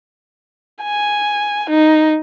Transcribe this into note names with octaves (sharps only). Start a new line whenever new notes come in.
G#5
D#4